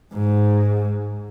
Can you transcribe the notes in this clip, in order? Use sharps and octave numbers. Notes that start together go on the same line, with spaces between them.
G#2